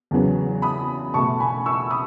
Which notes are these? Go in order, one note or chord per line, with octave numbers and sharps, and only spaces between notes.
E2 C#3 F#3 B3
B5 D#6
B2 A3 A5 C#6
G#5 B5
C#6 E6
B5 D#6